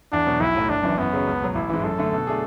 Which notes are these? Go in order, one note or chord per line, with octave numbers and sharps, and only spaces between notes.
E2 D4
B2 F#3
B1 E4
A2 F#3 A3
F#1 D4
F#2 E3
F#2 B3
C#3 F#3
C#2
B2 F#3
A1 E4
G#2 E3
F#2 A4
D3 A3
B2
A3 D4 G#4